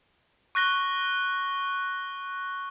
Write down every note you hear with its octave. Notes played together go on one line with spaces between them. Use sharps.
C#6 F#6 A#6 G7